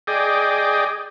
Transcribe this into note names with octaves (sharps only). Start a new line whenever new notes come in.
G#4 D5 D#5 G5